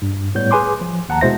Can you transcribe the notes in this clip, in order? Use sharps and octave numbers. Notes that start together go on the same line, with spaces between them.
G2
A2 G3 B3 C#5 G6
G#4 B4 G#5 C6 D6
F3
D#2 F#5 A5 A#5
B2 G#3 E4 C5 E5 A#6